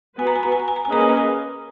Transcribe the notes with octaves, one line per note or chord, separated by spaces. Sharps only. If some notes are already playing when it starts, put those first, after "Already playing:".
B3 F#4 B4 G#5
A#5
G#5
A#5
G#5
A#5
G#5
A#5
G#5
A#3 C#4 G#4 B4 D#5 A#5
G#5
A#5
G#5